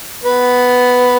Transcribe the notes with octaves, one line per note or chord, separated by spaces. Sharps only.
B3 B4